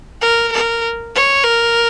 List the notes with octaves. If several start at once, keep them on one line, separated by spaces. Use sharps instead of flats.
A#4
A#4
C#5
A#4